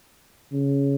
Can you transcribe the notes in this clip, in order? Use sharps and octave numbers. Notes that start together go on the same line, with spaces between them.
C#3